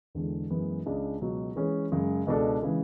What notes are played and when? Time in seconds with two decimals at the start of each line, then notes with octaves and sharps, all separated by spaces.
0.15 E2 D3 G#3
0.50 F#2 E3 G#3 B3
0.86 C#2 C#3 G#3 D4
1.21 C#2 B2 F#3
1.56 E3 G#3 C#4 G#4 B4
1.92 F#2 C#3 G#3
2.26 C#2 B2 G#3 D4 A4
2.62 C#3 E3 G#3